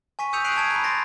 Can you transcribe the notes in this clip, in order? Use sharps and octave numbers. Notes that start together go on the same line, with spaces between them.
G#5 C#6 B6 D#7
D#6 E6 G6 C#7 D#7 F7
F#6 C7 D7 D#7 F7 F#7
A5 G#6 D7 F7
A#5 B5
C6 A6 A#6 C7 D7